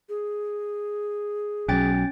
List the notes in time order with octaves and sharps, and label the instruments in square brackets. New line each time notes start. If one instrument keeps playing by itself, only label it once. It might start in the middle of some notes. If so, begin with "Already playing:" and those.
[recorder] G#4
[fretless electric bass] B1 F#3 [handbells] C#4 G5 A6